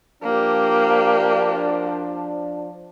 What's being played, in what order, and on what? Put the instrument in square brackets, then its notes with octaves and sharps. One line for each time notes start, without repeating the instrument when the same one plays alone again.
[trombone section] F3 D4 [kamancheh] A#3 G4